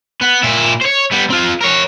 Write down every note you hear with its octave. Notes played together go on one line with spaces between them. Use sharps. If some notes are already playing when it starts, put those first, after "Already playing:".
B3
A#2 E4
C5 C#5
G3 B3
C4 F4
A#4 C#5